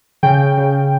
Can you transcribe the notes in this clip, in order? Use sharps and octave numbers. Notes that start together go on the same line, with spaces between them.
C#3 G5
C#3